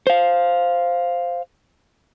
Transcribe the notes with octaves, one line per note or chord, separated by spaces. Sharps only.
C5 F5